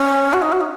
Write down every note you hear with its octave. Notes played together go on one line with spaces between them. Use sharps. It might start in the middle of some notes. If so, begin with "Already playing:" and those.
Already playing: C#4
F#4
D#4
F#4
D#4